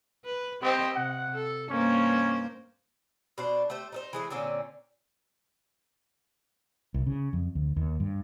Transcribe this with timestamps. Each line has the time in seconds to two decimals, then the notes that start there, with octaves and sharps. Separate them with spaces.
0.25 B4
0.62 C4 G4 C5 D#5
0.95 C3 F#5
1.34 A4
1.70 G2 A#3 C#4 C5
3.38 B2 D4 C5
3.70 A3 G4 C5
3.92 D#4 A4 C5
4.13 E3 G#3 A3
4.30 A#2 D3 C4 C#4
6.94 C2
7.07 C#3
7.33 F2
7.55 D2
7.76 D#2
8.00 G2